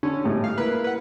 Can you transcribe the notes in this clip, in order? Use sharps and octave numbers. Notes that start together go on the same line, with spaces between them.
D3 C#4
G#1 A2 G3
F5
A#3 E4 B4
B4 F#5